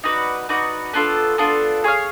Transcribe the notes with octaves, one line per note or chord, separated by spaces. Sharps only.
D#4 F#4 B4 D5
D#4 F#4 B4 D5
B3 D4 F4 A4
B3 D4 F4 A4
G#4 C#5 F5